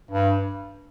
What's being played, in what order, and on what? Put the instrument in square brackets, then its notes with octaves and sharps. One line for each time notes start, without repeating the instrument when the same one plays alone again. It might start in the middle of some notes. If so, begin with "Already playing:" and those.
[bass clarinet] G2